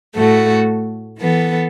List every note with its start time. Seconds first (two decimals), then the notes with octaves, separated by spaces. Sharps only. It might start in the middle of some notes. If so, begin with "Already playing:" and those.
0.15 A2 A3 F#4 A4
1.18 E3 B3 A4